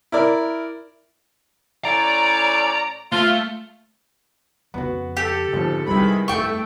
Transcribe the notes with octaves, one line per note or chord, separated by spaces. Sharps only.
E4 A#4 D5
A2 C#4 D5 A#5
A3 F4
F2 C#3 B3 F#4
G4 A4
G#1 D3 F3 B3
C3 D#3 E3 G3 G#3 D#4 E4 B5
G1 F2 A3 G5 C#6